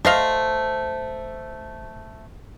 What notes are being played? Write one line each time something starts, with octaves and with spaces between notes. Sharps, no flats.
A3 C5 D#5 F5